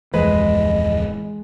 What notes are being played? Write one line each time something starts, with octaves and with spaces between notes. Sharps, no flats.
D1 F2 E3 G#3 B4 D#5